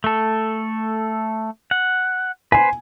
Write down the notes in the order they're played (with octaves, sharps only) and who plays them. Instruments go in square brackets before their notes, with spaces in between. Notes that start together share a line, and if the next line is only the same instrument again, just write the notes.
[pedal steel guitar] A3 A4
F#5
[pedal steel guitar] B4 C5 [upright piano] G#5